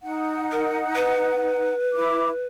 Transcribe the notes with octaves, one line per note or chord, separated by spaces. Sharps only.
D#4 F#5
A#4
B4
E4 D6